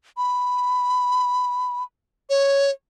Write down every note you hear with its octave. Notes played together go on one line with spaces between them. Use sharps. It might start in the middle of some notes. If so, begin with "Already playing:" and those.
B5
C#5